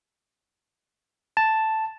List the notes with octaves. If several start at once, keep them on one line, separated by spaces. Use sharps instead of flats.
A5